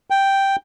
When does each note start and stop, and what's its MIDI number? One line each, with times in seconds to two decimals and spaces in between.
0.10 0.56 79